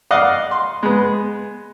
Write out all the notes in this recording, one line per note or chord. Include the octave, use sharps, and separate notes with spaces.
D5 D#5 F5 F#5
C6
G#3 B3